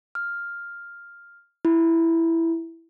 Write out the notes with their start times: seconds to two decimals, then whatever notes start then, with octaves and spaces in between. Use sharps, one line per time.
0.15 F6
1.65 E4